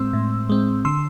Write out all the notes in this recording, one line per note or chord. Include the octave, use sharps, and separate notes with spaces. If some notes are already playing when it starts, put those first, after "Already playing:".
Already playing: A2 G#3 C4 C6 E6
A2
G#3 C4
D3 C6 E6